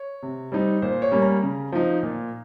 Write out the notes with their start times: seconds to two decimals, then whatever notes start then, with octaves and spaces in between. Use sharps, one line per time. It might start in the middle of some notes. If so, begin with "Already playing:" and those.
Already playing: C#5
0.23 C3
0.52 G3 C4 D#4
0.82 A#2 C5
1.02 C#5
1.12 G3 A#3 C#4
1.22 A#5
1.43 C#3
1.72 F3 C4 D#4
2.03 A#2